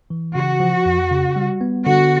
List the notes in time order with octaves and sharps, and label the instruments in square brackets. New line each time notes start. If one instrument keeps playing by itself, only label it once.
[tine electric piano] E3
[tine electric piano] C#3 [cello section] F#4
[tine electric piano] F3
F2
C#3
G3
B3
[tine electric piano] D3 [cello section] F#4